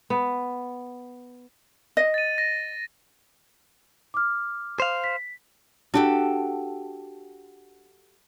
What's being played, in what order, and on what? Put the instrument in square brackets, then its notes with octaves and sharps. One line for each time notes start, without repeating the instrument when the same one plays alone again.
[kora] B3
[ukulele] D#5
[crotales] A6 D#7
A#6
[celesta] D6 F6
[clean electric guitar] C5 F5
[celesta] B6
[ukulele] D4 [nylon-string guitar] F#4 G4 A4